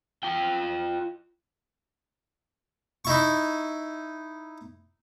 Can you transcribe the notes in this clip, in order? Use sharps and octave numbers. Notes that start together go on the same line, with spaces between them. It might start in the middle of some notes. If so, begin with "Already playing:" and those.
F4 G5
D#4 E4 C#6